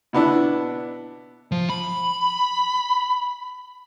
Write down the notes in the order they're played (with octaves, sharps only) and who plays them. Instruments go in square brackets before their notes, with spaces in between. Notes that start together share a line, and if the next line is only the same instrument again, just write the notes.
[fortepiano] B2 B3 D4 E4
[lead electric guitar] F3
B5